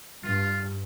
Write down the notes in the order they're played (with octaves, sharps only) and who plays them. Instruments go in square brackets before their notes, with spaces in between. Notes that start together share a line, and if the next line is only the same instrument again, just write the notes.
[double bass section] G2 [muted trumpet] F4